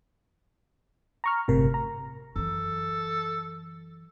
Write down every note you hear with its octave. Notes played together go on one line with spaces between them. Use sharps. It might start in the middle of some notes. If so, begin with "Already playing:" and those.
A#5 C#6 F6
G1 A2 C3 A#4
A#5
F#2 E3 A4